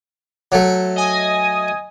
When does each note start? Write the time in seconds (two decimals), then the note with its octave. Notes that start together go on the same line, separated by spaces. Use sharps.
0.52 F#3 A3
0.96 D#5 G#5 D#6